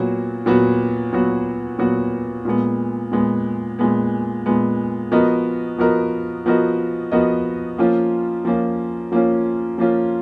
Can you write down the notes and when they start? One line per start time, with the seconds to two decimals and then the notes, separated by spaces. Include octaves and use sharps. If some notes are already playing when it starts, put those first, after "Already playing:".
Already playing: A#2 F#3 B3 F#4
0.46 A#2 F#3 B3 F#4
1.13 A#2 F#3 B3 F#4
1.79 A#2 F#3 B3 F#4
2.45 A#2 G#3 B3
3.12 A#2 G#3 B3
3.79 A#2 G#3 B3
4.46 A#2 G#3 B3
5.12 F3 B3 F#4 A#4 D#5
5.78 F3 B3 F#4 A#4 D#5
6.46 F3 B3 F#4 A#4 D#5
7.11 F3 B3 F#4 A#4 D#5
7.78 F3 A#3 C#4 F4
8.45 F3 A#3 C#4 F4
9.12 F3 A#3 C#4 F4
9.78 F3 A#3 C#4 F4